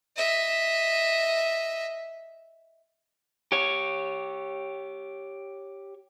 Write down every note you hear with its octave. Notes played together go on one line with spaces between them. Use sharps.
D#5 E5
G4 C#5